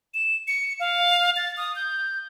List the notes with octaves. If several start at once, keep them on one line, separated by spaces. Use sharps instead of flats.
E7
C#7
F5
A6
D#6
G6